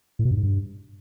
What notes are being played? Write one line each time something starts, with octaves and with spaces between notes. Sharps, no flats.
A2
B2
G2
G#2
G2